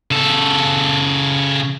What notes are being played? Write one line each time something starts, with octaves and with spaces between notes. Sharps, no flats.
C#3 A4